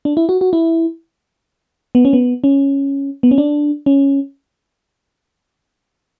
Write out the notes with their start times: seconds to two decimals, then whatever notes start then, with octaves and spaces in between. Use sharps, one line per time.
0.05 D4
0.17 E4
0.29 F#4
0.41 F#4
0.53 E4
1.95 B3
2.05 C#4
2.13 B3
2.44 C#4
3.23 B3
3.31 C#4
3.38 D4
3.86 C#4